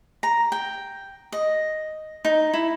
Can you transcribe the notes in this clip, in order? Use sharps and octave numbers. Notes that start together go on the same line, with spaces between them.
A#5
G5
D#5
D#4
E4